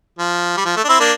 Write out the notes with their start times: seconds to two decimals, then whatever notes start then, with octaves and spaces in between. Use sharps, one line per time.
0.19 F3
0.57 G3
0.65 F3
0.77 A3
0.84 D4
0.89 C4 E4
1.00 A#3 D4